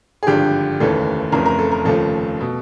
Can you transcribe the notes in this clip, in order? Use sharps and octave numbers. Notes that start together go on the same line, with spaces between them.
G#4
G#1 G2 D3 F3 G4
F1 D#2 C#3 E3 A4
F1 F2 C#3 E3 A#4
A#4
A4
A#4
F1 D#2 C#3 F3 A4
B2